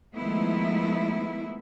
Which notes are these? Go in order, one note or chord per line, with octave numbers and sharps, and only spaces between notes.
D#3 F3 G#3 A3 B3 E4